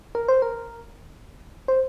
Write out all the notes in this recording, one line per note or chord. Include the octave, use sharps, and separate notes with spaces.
A#4
C5
A#4
C5